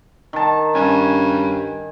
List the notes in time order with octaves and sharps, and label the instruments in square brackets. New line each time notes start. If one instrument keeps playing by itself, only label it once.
[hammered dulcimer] D#3 A5
[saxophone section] G2 C#4 [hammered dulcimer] G#5